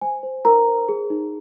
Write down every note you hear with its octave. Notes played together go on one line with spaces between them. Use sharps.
C5 G#5
C5
D#4 A#4 A#5
C5
G#4
D#4